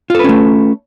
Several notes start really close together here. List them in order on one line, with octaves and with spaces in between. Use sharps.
F4 A4 B4 C#4 A3